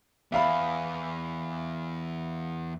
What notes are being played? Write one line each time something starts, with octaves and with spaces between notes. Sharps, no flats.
E2 E5 F5 B5